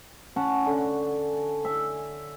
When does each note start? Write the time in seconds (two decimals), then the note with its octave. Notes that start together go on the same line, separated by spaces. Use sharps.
0.36 C#4 F#5 A5
0.66 D3
1.65 E5 G#5